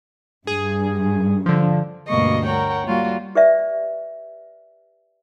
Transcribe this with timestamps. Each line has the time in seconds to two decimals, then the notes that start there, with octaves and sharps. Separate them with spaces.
0.47 G2 G#4
1.46 D3 F3
2.08 D2 G2 B2 A#3 D#5 C#6
2.45 A#4 C#5 F#5 G5
2.87 G3 A#3 F4 F#4
3.35 G4 B4 D5 E5